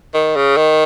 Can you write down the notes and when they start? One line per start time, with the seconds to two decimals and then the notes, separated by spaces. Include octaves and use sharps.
0.14 D#3
0.36 C#3
0.57 D#3